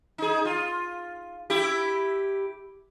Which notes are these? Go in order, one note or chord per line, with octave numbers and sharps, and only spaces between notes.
D#4 G#4
F4
E4 G4